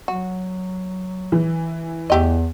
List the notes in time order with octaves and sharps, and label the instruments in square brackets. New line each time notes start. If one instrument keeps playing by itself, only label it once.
[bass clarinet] F#3 [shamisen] F#4
[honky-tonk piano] E3
[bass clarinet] E2 [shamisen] A3 G4 D#5